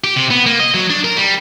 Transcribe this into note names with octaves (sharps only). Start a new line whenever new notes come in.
G4
C3
B3
A#3
D#5
F#3
D4
A#4
G3